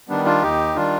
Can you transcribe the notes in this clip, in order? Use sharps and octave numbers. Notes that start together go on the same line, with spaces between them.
D#3 G3 B3 D4
D4 F4
D#2 D#4 G4
D#3 G3 D4 F4